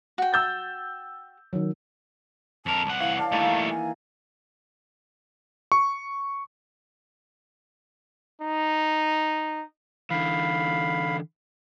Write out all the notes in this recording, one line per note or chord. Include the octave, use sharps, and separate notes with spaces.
F#4 G5
E6 G6 A6
D#3 F#3
F2 A#4 A5
C2 F#5
E3 F5 C#6
D4 F5 A5
D#3 E3 G3 A3 A#3
G#5
C#6
D#4
D3 E3 F5 B5